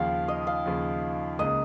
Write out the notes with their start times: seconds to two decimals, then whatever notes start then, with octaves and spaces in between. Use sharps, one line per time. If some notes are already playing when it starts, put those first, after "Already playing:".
Already playing: D#2 C#3 F3 F5
0.28 D#5
0.47 F5
0.66 D#2 C#3 F3
1.39 C#2 C#3 A#3 D#5